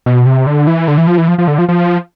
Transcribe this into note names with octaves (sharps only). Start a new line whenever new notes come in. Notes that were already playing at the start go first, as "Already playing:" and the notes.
B2
C3
D3
E3
D3
E3
F3
E3
F3
F3
D3
F3
F3